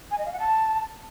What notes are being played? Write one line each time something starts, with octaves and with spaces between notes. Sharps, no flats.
G#5
D#5
F5
F#5
A5